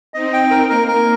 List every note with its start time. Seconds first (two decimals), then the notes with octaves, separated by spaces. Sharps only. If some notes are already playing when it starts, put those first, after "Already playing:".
0.14 C4 D#4 D#5
0.33 G5
0.51 A#4
0.69 A#3 A#4
0.88 A#4